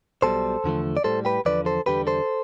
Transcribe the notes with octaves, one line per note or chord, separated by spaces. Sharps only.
B1 B2 G3 A4 C5
E2 D3 F3 A3
D5
A2 G3 A4 C5
G4 B4
E2 D3 F3 B4 D5
A4 C5
E2 D3 G3 G4 B4
A4 C5